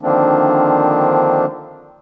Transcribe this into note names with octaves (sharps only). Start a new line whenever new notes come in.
D3 D#3 F3 A#3 C4 D4